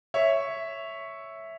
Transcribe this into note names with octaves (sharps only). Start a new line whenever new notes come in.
C#5 E5